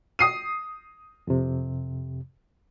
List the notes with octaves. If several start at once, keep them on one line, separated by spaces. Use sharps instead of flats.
D#6 C7 D#7
F2 C3